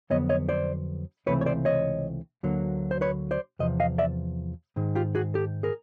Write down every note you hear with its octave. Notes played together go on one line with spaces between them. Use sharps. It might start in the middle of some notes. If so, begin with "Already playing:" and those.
F2 D3 F#3 B3 C#5 D#5
C#5 D#5
C5 D5
C#2 C3 E3 A3 C4 B4 C#5
C#5
C5 D5
C#5 D#5
D2 D3 F#3 A#3
C5
B4 C#5
C5 D5
E2 C3 F3 D#5
D#5 F5
D5 E5
G#2 D#3 G#3
F4 G4
F#4 G#4
G4 A4
G#4 A#4